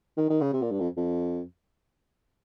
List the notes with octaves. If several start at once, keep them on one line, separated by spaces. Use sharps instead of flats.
D#3
D#3
C#3
C3
A#2
G2
F2
F2